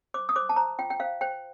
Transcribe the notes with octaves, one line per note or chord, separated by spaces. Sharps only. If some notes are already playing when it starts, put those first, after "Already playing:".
C5 D6
D#6
C5 D6
A5
C5 A#5
F4 G5
G5
C5 F5
C5 G5